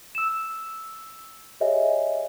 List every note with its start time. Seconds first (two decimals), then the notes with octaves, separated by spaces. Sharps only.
0.15 E6 E7
1.61 G4 G#4 C#5 D#5 E5 G#5